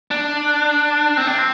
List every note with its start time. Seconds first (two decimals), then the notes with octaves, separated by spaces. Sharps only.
0.11 D4
1.17 C4
1.27 D4
1.38 C4